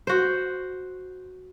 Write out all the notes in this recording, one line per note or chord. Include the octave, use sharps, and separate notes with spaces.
F#4 C5